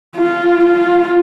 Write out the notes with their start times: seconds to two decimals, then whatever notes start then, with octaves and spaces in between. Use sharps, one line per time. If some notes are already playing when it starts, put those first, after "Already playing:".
0.16 F4
0.65 F4